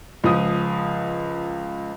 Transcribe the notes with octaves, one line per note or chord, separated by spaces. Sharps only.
C#2 F3 D#6